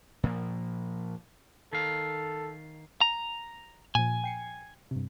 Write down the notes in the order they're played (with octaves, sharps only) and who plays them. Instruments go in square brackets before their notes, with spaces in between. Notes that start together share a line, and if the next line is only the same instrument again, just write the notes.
[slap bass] A#2 F3 A#3
[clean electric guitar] D#3 F5 [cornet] A4
[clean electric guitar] A#5
[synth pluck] A#2 F3 [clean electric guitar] G#5
[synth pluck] G5 C7 C#7
G2 C3